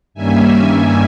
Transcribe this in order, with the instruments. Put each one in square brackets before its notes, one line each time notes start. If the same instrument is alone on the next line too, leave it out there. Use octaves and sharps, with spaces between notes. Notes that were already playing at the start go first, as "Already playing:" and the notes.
[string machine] G2 D#3 G3 A#3 C#4 E5 G#5